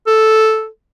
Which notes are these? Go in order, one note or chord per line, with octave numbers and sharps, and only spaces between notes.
A4